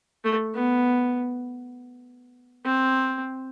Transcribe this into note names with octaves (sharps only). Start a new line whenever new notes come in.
A3
B3
C4